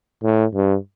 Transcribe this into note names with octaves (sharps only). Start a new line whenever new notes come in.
A2
G2